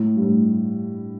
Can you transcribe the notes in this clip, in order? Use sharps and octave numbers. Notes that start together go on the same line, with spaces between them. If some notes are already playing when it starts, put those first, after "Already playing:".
Already playing: A2
G2
A2